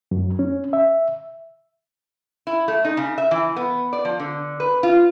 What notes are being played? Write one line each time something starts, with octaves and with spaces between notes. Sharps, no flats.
F#2
C#4
E5
E4
A3
D#4
C#3
E5
E3
B3
D5
F3
D3
B4
F4